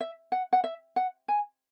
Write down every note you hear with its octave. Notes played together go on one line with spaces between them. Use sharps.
E5
F#5
F#5
E5
F#5
G#5